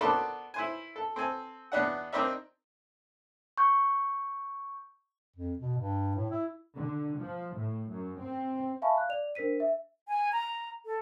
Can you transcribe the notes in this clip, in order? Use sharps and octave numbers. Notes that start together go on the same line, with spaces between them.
B3 D4 A4 A#4 C5 D5
E4 C5 G#5
A4
C4 A4 G#5
E2 B3 D4 F#5
C4 D4 D#4 A#4 D5 E5
C#6 G6
F2
B2
G2
A2
E4
D3
F3
A2
F#2
C4
E5 F5 G#5 A5 B5 C#6
F5 F#6
D5 F7
D4 A#4 C5 B6 D#7
E5
G#5
A#5
A4